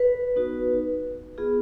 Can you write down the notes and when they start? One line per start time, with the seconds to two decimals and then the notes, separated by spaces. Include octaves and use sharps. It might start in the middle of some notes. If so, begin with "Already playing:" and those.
Already playing: B4
0.35 B3 D#4 F#4
1.38 B3 F4 G#4